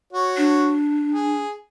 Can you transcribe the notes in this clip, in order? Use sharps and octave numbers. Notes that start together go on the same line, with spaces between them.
F#4 C#5
D4
G#4